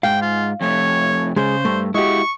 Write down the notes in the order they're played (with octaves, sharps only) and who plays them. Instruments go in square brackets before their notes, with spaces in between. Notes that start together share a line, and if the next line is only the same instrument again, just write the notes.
[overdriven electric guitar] G#2 [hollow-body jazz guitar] F5 [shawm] G5
[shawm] F4
[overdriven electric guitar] F2 A3 [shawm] C#5
[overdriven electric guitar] C#3 [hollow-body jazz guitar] G#3 G#4 [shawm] C5
[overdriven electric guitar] G2 [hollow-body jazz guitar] A3
[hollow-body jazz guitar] G#3 G4 [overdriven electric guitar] E4 F#4 [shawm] C#6